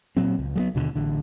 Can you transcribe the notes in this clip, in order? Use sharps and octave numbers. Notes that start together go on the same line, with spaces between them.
A#2 F#3 C4
C#2
F#3 G3 B3
D#2 B2 D3
A1 D3